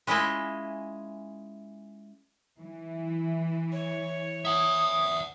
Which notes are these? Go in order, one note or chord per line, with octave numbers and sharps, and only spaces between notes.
G#3 C#4 E4 F4 D#5 E5
E3
C#5
E5 F#5 D#6